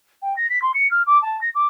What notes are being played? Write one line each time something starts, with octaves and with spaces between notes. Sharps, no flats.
G5
A#6
B6
C6
C#7
F6
D6
A5
A#6
D6